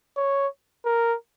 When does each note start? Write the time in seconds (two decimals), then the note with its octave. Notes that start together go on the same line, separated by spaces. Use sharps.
0.17 C#5
0.85 A#4